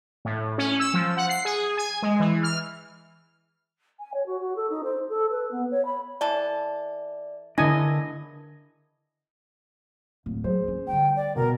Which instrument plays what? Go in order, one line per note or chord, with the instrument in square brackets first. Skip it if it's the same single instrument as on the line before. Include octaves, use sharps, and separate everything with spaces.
[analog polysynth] A2
C#4
E6
F3
F#5
C7
G#4
G#5
G#3
E3
F6
[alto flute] G#5
C#5
F#4
F#4
A4
D#4
C5
A4
B4
B3
C#5
B5
[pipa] E3 A4 [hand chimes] D5
[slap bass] D3 D4 [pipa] B3 [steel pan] E4 D#5 G#5 [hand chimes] A#4 A#6
[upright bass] D1
[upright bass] F#3 [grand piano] G#4 C5
[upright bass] C#4
[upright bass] D3 G3 [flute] G5
[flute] D5
[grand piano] B2 [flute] A#4